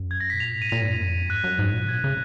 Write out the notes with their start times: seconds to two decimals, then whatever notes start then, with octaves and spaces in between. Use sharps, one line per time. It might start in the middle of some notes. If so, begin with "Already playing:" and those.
Already playing: F#2
0.11 G#6
0.20 A#6
0.30 B2 B6
0.40 A#2 F7
0.55 G#2
0.62 D#7
0.70 A#2 F7
0.82 G#2
0.90 F#2
1.00 F2
1.19 F#2
1.29 G#2 F#6
1.44 F#2
1.59 G#2
1.73 A#2
1.84 C#3
1.89 B2 G#6
2.04 C#3